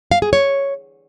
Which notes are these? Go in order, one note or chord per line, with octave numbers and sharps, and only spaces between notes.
F5
G#4
C#5